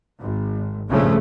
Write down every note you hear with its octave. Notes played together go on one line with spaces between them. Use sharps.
G#1
A#1 G2 A#2 C#3 F3 A3